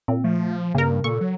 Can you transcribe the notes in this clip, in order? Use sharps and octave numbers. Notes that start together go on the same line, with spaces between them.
A#2 C4
F3 A3
G2 C#3 A#3 A#4
A#2 A4 C#6
F#3